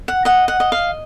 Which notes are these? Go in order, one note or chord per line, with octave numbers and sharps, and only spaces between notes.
F#5
D#5 F#5
F#5
D#5
F5